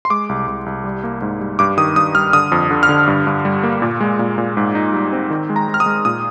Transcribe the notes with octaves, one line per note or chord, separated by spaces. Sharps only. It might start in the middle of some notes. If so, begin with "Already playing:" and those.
C6
G#3 D6
C2
C2
C2
G3
A#3
G#2
G3
G2 D6
D#3 D#6
G2 D#6
G3 F6
D3 D#6
F2
D3
F6
D3
G2
G2
G3
A#3
A#2
G#3
A#2
A#2
G#2
D#4
G3
C4
D#3
G#3
A#5
G#3
F6
D#6
G#3
A#2 D#6